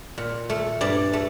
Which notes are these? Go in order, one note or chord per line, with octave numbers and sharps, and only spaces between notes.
A#2
A3
G2 D5
A3